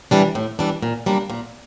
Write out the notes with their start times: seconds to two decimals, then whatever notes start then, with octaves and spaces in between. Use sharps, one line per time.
0.11 E3 G3 D4
0.35 A2
0.59 E3 G3 D4
0.83 A#2
1.06 G3 A#3 D4
1.30 A#2